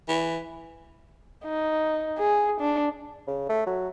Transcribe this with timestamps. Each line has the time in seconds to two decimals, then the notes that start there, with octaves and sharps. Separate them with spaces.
0.08 E3
1.44 D#4
2.18 G#4
2.61 D4
3.27 C#3
3.49 A3
3.67 F#3